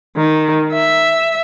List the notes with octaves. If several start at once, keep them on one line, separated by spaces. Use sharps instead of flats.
D#3
E5